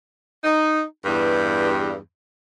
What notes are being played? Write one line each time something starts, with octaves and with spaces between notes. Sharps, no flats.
D#4
E2 G2